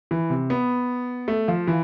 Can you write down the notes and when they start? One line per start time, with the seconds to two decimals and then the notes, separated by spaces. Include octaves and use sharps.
0.11 E3
0.30 C3
0.50 B3
1.28 A3
1.48 F3
1.67 E3